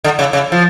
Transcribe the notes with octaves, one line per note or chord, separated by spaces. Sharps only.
D3
C#3
C#3
F3